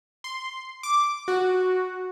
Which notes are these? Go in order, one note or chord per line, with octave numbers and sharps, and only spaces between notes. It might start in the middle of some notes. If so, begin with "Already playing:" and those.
C6
D6
F#4